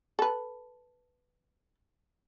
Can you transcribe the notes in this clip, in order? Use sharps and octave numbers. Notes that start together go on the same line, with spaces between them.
A4 B4